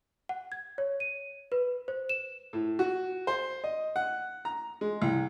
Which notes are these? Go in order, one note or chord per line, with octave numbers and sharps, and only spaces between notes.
F#5
G#6
C#5
D#7
B4
C5
E7
A2
F#4
C5
D#5
F#5
A#5
G#3
C2